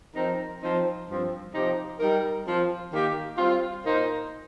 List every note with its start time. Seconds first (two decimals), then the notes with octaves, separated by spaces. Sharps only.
0.15 F3 C4 D#4 A#4
0.62 F3 C4 D#4 C5
1.07 G2 F3 C4
1.53 C3 F3 D#4 G4 C5
2.00 G3 D#4 A#4
2.45 F3 C4 F4 C5
2.91 D#3 A#3 G4
3.37 G3 C4 F4
3.84 A#2 A#3 D#4 C5